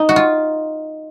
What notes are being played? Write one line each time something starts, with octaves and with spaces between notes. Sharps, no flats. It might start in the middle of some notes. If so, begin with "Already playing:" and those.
Already playing: D#4
F#4
F4